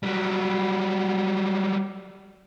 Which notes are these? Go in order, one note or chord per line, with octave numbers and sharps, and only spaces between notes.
F#3 G3